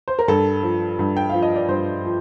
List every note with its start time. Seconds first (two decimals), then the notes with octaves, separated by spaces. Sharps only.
0.08 C5
0.19 A#4
0.28 G2 A4
0.63 F3
0.99 G2
1.17 G5
1.30 F3 F5
1.42 D#5
1.56 D5
1.68 G2 C5
2.04 F3